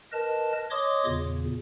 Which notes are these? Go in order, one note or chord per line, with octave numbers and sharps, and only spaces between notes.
A#4 B4 D#5 A5
C#5 D#5 C6 D6 D#6
E2 A#2 C#3